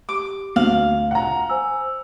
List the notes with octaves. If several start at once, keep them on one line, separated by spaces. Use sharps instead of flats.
G4 D6
D2 F5 F#7
F#5 A#5
C5 G#5 E6